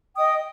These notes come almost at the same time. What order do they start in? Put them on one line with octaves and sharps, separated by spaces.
G5 D#6 D#5